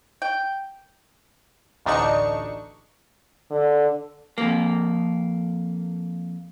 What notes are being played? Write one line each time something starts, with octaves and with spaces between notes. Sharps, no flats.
G5
A1 D2 D4 D#4 C#6 C#7
D3
F2 A#3